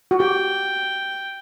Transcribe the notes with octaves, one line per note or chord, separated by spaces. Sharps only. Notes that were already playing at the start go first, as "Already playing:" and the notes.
F#4
G4 G5